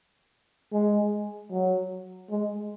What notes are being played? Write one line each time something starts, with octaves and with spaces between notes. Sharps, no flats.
G#3
F#3
G#3